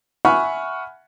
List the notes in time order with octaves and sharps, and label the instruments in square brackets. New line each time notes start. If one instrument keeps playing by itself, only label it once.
[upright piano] E5 F#5 G#5 B5 C#6 F6